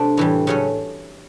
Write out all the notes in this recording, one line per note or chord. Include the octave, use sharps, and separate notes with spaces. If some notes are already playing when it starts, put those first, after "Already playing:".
Already playing: C3 A3 D4
A2 E3 G3
C#3 F#3 A3 C#4